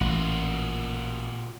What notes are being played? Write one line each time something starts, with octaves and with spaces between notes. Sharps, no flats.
A1 A#2 F4 F#4